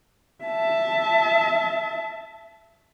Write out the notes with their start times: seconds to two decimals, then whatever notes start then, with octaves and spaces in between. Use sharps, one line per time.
0.45 E5 A5